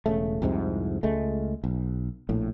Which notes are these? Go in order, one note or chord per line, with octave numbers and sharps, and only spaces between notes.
E1 C#3 A3
C2 F2 G#2 C3
C#2 G#3 A3
B1
A#1 A2